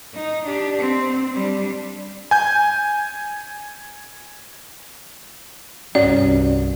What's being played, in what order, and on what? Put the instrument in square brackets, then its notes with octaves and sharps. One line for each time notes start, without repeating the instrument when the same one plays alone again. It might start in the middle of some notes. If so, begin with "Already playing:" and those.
[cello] D#4
D4 G4
C4
G3 D4
[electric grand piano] G#5 G6
[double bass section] C2 G2 [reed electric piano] C#4 F#4 [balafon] D5